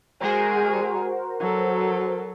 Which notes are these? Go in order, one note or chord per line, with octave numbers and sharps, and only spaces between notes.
G#3 F#4 G#4 A#4 C5
F#3 A4